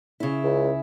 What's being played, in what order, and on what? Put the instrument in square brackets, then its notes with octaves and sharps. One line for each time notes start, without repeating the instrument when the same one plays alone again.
[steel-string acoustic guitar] C#3 E4
[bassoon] C#2